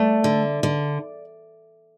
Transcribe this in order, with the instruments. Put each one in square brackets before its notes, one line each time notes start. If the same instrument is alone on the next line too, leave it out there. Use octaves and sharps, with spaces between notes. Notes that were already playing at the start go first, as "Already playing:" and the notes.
Already playing: [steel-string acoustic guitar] A3 D5
D3
D3